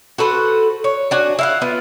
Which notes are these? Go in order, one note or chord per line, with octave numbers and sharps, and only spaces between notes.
F#4 A4 B4 C5
C#5
D4 F#4 G#5
E4 F5 F#5
B3 F4